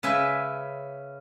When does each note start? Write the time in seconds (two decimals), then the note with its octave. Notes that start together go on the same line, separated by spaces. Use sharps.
0.03 C#3 B4 E5 G#5